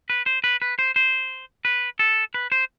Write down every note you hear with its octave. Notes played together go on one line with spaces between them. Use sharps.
B4
C5
B4
B4
C5
C5
B4
A4
B4
C5